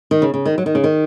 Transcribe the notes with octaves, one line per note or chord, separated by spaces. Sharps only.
D#3
C#3
C#3
D#3
F#3
D#3
C#3
D#3